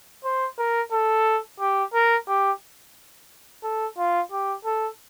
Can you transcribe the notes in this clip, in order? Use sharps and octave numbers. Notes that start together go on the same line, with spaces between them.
C5
A#4
A4
G4
A#4
G4
A4
F4
G4
A4